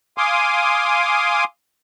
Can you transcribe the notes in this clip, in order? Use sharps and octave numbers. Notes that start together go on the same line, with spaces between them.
F5 G#5 C6 D6 D#6